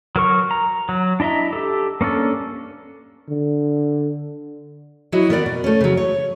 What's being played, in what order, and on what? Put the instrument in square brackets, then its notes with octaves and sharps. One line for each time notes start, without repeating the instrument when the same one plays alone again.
[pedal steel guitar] F#3 A#4 C#6
A#5
F#3
D4 E4 D#5 E5 A#5
G4 A4
A#3 C#4 D4 A4
[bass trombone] D3
[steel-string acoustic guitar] F#3 E4 F#4 D#5
D#3 B3 A#4 B4 D5 F#5
B2
A3 C#4
C#3 F#3
C#5